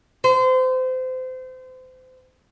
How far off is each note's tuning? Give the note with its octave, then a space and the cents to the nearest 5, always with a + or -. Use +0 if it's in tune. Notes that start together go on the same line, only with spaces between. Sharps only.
C5 -30